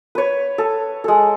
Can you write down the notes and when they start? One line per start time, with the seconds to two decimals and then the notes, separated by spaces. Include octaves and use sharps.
0.15 B4 C#5
0.58 A4
1.04 G#3 A4